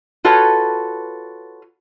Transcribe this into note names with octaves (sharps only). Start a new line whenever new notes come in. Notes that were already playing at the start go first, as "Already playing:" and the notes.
F4 F#4 A4 B4 C#5